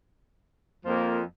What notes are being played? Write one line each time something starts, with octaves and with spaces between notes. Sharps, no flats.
F2 F3 A#3